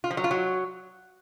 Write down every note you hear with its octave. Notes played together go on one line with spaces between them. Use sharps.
F4
F3
F#3
F4
F#3